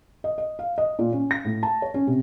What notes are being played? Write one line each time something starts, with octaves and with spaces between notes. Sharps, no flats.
D#5
D#5
F5
D#5
A#2
C#4
A#6
A2
A5
C#5
C#4
C3